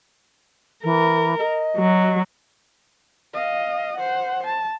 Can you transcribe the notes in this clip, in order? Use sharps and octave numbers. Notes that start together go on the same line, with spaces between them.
E3 A#4
D#5
F#3
D#5 F5
C5 F#5
A5